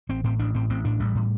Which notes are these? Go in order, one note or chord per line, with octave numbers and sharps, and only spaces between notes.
A1 C4
A2 C4
A1 D4
A2 C4
A1 C4
A2 D4
A1 G3
A2